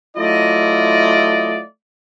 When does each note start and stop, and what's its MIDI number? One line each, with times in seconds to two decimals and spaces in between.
0.17 1.61 54
0.17 1.61 57
0.17 1.61 64
0.17 1.61 65
0.17 1.61 74
0.17 1.61 75